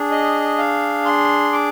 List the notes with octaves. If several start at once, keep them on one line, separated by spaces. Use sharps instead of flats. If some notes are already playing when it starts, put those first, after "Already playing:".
Already playing: D4 G#4
D#5
F5
C6
D6